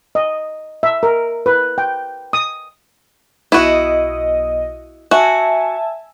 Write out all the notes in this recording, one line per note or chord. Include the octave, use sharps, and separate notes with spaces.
D#5
E5
A#4
B4
G5
D#6
B1 E4 F#4 D#5
F#4 E5 G#5 A5